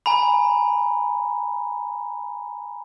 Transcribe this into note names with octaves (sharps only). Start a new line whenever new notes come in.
G#5 A#5 B5